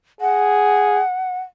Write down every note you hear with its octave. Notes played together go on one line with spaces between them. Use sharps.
G#4 F#5